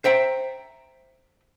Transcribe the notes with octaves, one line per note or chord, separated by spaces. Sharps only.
C5 E5 G5 A#5